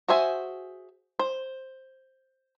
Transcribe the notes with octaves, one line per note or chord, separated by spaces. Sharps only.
F#4 G#4 C5 E5 G#5
C5